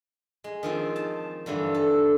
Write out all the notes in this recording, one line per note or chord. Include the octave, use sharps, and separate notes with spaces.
G#3
D#3 F3 C4
A5
G2 D3 E3 G3
A4